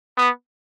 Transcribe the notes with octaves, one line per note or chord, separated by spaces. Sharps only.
B3